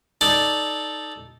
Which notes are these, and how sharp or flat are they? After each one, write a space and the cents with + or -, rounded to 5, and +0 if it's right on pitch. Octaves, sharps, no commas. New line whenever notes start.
D#4 +0 A4 -10 D5 +0